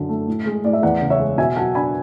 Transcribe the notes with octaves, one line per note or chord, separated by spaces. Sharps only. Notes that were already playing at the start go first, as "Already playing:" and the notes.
Already playing: F#2 D3
A3
A2
G#3
A2 D5
E5
E2 D5 F#5
C#3
C#5 E5
G#3
B2 E5 G#5
F#3 F#5 A5
D4 G#5 B5